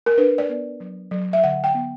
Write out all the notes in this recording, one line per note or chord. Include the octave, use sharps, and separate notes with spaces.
A#4
D4 B4
D5
B3
F#3
F#3
E5
D3 F#5
G5
B3